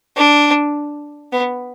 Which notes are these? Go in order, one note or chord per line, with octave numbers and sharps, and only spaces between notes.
D4
B3